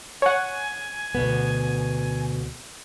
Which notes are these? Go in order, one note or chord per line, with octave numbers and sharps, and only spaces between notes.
C#5 F#5 G#5
D2 B2 B3